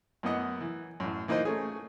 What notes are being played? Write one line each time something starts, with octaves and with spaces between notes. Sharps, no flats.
F#2 A#3 B3 D#5 F#5
E3
A1 F#2
E3 A#3 D#4 F4 C5
A3 C#4 G#4